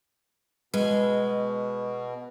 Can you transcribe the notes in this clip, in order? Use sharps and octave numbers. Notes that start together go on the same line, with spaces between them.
B2 G#3 B4